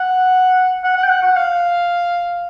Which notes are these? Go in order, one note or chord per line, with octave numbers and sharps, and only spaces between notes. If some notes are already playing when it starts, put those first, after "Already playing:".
Already playing: F#5
F#5
F#5
G5
F#5
F#5
F5